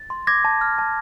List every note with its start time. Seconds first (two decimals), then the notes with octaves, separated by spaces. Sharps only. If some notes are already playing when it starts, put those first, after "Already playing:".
Already playing: A6
0.10 C6
0.27 D6 G#6 A#6
0.45 A5
0.61 F6
0.78 A5